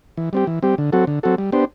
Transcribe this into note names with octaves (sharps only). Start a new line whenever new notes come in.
E3
G3 C4 G4
E3
G3 C4 G4
D3
F#3 C4 F#4 A4
D3
F#3 C4 F#4 A4
G3
B3 D4 G4 C5